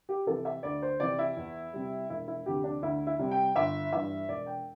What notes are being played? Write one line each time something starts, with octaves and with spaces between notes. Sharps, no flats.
G4
C3 E3 A4
E5
D2 D5
C5
C3 E3 D5
E4
E2
C3 G3
E1 E4
E4
D2 C3 E3 G4
D4
D2 E4
E4
C3 G3
G5
G1 E5
G2 E3 E5
E1 D5
G5